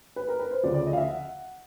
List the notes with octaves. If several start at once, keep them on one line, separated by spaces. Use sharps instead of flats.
B4
A#4
B4
C5
D2 C#3 F3 D5
D5
D#5
F5
E5
F#5